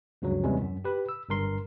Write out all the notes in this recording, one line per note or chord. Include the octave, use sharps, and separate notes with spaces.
D2 G2 C#3 F3 F#3
D#2 C3 E3 G3 G#3 C#4
F#2
G4 B4
E6
G1 G2 A#4 C6